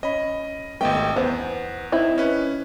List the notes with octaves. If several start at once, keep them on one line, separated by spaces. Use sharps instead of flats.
C#4 D#5 B5
G#1 A3 B3 G4 D#5 G5
E2 B3 C5 F#5
C4 D#4 E4
C#4 B4